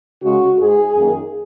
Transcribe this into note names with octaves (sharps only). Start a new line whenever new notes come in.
C#3 G#3 F#4
G#2 G#3 G#4
F#2 D#3 A#3